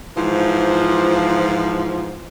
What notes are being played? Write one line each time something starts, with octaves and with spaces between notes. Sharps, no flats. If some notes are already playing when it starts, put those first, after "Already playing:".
G#2 E3 F3